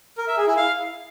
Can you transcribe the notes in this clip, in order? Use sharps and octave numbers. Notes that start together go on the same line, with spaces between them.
A#4
E5
G#4
E4
F5